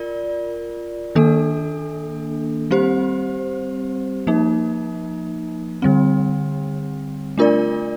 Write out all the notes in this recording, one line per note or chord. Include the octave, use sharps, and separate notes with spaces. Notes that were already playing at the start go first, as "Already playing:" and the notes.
Already playing: F4 A#4 D5
D#3 A#3 D4 A4
G3 C4 G4 C5
F3 A#3 D#4
D3 G3 C4
A3 D4 F4 A#4 D5